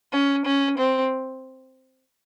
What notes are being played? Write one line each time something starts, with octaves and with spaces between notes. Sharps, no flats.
C#4
C#4
C4